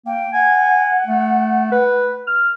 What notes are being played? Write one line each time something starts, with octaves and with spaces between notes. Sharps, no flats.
A#3 G5
F#5 G#5
A3
B4
F6